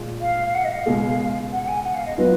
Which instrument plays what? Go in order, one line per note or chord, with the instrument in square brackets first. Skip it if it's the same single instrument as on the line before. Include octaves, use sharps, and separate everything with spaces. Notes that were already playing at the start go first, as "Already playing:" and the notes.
Already playing: [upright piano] A#2 G#3 F4
[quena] F5
F5
F#5
D#5
F5
[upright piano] C#2 B2 G#3
[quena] F#5
F#5
G#5
F#5
F5
D#5
[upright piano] F#3 B3 F4 [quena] B4